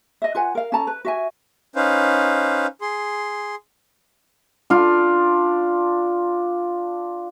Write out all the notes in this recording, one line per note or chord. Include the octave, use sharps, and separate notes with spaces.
D#5 E5
F4 B4 F#5 G#5
A#4 F5
C#4 A4 A5 A#5
B4
F#4 E5 G#5
C#4 D#4 B4 C5 F5
G#4 C6
D4 F4